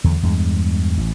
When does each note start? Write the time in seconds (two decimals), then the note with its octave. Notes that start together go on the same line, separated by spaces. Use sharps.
0.04 E2 D3 F#3
0.23 E2 G2 G#3
0.98 A1